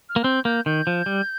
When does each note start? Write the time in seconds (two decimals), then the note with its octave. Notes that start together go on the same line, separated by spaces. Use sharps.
0.09 F6
0.16 A#3
0.24 C4 G6
0.45 A#3 G6
0.66 D#3 G6
0.87 F3
1.06 G3